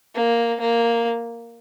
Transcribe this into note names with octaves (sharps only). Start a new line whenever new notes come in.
A#3
A#3